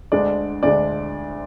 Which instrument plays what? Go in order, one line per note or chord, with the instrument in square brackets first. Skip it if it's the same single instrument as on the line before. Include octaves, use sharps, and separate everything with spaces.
[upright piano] D2 D3 G#3 D4 [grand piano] D5
[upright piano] D2 D3 G#3 D4 [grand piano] D5